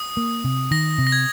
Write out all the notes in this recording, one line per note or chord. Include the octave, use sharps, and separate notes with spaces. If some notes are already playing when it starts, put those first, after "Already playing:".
Already playing: D#6
A#3
C3
D#3 A#6
C3
A#6
G#6